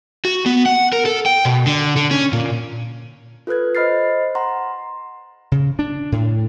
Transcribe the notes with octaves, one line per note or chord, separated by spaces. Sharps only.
F#4
B3
F#5
A#4
A4
G5
B2
D3
D3
C#4
A#2
F4 A4 B4 F#6 G#6
C5 D#5 B5 F6 A6 C7
F#5 A#5 C6
C#3
D4
A2